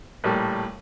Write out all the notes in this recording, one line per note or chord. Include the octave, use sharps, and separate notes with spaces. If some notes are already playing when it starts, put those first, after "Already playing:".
A#1 A2 G3